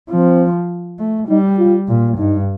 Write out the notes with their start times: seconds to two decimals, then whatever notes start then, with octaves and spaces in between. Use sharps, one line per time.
0.10 F3 C4
0.99 A3
1.28 G3 D#4
1.58 F4
1.88 A#2
2.18 G2 D#4